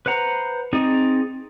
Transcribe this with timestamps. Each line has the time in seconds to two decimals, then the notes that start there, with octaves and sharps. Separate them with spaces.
0.06 B4 C5 F#5 A#5
0.73 C4 D#4 G#4 D5